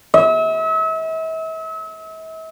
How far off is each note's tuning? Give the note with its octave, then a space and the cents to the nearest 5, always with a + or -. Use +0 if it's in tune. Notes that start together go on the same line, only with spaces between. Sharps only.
E5 -40